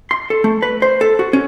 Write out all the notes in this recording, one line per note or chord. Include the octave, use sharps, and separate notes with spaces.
C6
A4
A3
B4
C5
A4
F#4
C#4